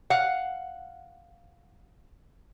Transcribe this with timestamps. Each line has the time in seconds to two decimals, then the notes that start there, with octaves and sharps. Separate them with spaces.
0.10 F5 F#5